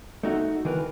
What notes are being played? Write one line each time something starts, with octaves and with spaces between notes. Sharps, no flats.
A3 D#4 F#4
D#3 E3 A#4 B4